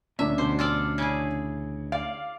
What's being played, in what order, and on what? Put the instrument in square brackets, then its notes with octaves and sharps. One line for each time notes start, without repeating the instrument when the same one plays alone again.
[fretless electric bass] D2 A#2 [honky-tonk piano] C#4 D4 [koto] E5
[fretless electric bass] D2 B2 [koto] C5
[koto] F4 A4 D5
C#3 E4 G#4
[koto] D5 [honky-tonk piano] F5